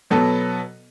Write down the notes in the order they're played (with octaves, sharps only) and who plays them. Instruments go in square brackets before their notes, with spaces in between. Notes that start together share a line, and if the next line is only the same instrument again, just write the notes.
[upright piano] B2 F#3 B3 A4